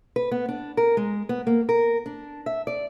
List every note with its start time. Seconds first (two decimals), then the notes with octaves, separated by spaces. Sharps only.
0.16 B4
0.31 B3
0.49 D4
0.77 A#4
0.97 G#3
1.29 B3
1.47 A#3
1.69 A#4
2.06 D4
2.46 E5
2.67 D5